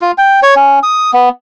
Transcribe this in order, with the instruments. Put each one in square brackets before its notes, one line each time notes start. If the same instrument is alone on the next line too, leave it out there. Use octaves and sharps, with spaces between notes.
[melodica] F4
G5
C#5
C#4
D#6
B3